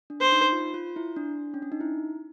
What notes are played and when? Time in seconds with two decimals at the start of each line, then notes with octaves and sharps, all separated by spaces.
0.10 D4
0.21 C5
0.32 D#4
0.52 F4
0.74 F4
0.96 E4
1.16 D4
1.54 C#4
1.62 D4
1.72 D#4
1.81 E4